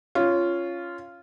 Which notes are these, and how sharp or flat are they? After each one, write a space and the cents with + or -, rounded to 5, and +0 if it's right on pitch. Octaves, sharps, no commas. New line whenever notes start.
C#4 +0 F4 -10